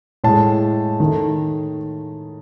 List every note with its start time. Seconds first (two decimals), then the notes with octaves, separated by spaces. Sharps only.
0.24 A2 G#3 A5
1.00 D#3 A3